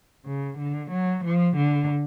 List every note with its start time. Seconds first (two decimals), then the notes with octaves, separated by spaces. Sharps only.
0.25 C#3
0.57 D3
0.90 F#3
1.25 F3
1.57 D3